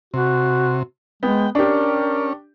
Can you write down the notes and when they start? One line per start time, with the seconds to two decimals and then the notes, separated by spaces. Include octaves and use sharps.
0.14 C3 F#4
1.23 G#3 B3 G5
1.55 C#4 D4 G4 A#4